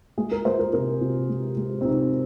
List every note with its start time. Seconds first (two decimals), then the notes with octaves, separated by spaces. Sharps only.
0.18 G#3 G#4
0.32 A#4
0.45 G#3 C5
0.59 A#4
0.73 C3 A#4
1.01 C3
1.29 G#3
1.57 G#3
1.81 C4
1.85 C3 D#4